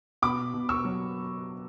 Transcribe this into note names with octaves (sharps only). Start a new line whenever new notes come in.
B2 B5 D6
B2
C#6 E6
F#3